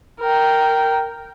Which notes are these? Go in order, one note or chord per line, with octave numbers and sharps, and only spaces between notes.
A#4 G5